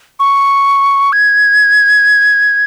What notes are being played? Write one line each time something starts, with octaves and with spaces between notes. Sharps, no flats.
C#6
G#6